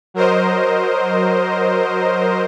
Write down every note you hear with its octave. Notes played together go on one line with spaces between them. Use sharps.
F#3 A#4 C5 D#5